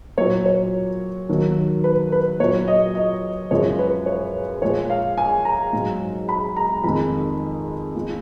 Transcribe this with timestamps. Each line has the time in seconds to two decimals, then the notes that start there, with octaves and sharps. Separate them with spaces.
0.18 A#2 F#3 C#5
0.46 C#5
1.29 D#2 D#3 F#3
1.84 B4
2.12 B4
2.40 A#2 F#3 C#5
2.68 D#5
2.95 D#5
3.51 F#2 C#3 F3 G#3 C#5
3.79 B4
4.06 C#5
4.62 A#2 F3 G#3 C#5
4.90 F5
5.18 G#5
5.45 A#5
5.73 G#2 F#3
6.29 B5
6.57 A#5
6.84 F2 D#3 G#3 B5
7.95 F3 G#3